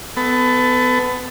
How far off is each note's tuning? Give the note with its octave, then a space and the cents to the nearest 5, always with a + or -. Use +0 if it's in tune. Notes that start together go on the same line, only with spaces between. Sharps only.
B3 +25 A4 +0